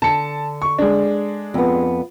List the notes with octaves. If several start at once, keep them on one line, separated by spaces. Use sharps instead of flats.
D3 A5 C#7
C#6
G#3 D4
F2 B3